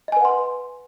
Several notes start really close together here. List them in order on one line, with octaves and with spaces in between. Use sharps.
D#5 G#5 B4 F#5 C6